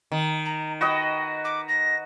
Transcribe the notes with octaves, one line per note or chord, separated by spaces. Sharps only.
D#3
A#5
F#4 B4 D#5 G5
D6
A#6